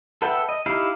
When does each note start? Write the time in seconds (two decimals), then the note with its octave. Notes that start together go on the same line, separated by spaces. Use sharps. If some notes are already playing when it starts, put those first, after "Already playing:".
0.22 A4 B4 E5 F#5 G5
0.49 D#5
0.66 D#4 E4 G4 F5